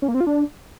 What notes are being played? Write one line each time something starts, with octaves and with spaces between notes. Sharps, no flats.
C#4
A#3
C4
F4
D4